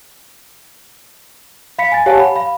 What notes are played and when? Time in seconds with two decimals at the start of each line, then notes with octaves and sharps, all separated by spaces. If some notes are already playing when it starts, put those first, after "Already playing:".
1.79 F5 B5 B6 C#7
1.92 G#5 A6
2.06 G4 C#5 F5 F#5 G#5 A5
2.20 B5
2.36 F5 B5